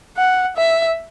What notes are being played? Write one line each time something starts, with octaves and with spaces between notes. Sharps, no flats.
F#5
E5